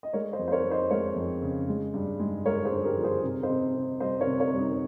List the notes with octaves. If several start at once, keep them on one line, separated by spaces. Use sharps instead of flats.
D#5
G#3 A#4 C#5
C5 D#5
F2
C5
A#4 C#5
F2
C5 D#5
G#3 A#4 C#5
F2
C#3
G#3
G2
G#3
G#3 A#4 C#5
G#4 C5
G2
G4 A#4
F3 A#4
G#4 C5
C3
C5 D#5
C3
C3
G3 C5 D#5
A#4 C#5
C3
A#4 C#5
G3
D#4